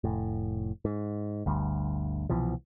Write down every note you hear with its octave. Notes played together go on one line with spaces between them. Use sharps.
F1 A2
G#2
G1 D2 G2
C2 B2 E3 F3